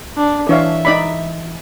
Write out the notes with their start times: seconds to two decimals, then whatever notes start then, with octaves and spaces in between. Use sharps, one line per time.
0.17 D4
0.49 E3 D4 C#5 E5 F5
0.85 D#4 D5 B5